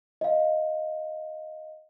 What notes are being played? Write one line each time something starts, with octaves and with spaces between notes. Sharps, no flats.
D#5 F5